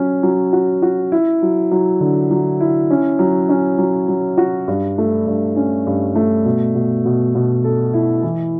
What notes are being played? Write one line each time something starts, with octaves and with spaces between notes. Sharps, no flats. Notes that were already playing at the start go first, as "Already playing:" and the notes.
Already playing: F#3 C#4
F#3
F#4
F#4
E4
F#3
F#3
D3
F#3
E4
C#4
F#3
C#4
F#3
F#3
F#4
G2
A3
G2
C#4
G2
A3
B2
B2
B2
B2
A4
E4
E3